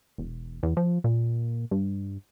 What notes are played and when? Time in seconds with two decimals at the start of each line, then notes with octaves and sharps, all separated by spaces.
0.18 E1
0.63 E2
0.77 F3
1.04 A#2
1.71 G2